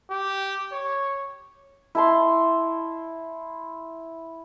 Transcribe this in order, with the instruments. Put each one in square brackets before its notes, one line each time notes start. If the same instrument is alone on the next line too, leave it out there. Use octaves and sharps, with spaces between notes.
[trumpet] G4
C#5
[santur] E4 A5 C6